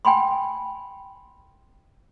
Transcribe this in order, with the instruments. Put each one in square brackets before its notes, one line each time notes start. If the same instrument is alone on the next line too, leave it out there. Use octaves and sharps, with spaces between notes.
[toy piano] G5 G#5 B5 C6